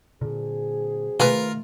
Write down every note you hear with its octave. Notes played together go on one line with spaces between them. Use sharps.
A#2 D3 F#3 C4 G#4
D#3 A3 F4 A#4 B4 G#5